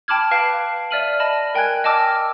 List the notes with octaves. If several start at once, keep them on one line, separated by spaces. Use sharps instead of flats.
G5 A5 B5 D6 F6 G#6
B4 F5 A5 D7
D5 E5 F6 D#7 F#7
D#5 A5 B5
A#4 G5 G#5 F#6 G#6
D#5 G5 A5 D6 E6 F6